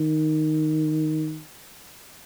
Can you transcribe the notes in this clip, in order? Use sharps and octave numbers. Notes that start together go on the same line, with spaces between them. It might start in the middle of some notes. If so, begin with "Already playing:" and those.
Already playing: D#3